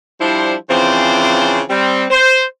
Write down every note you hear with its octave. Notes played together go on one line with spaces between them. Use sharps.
F3 G3 D4 E4 C5
C#3 E3 F3 C4 D4 C5
G3 C4
C5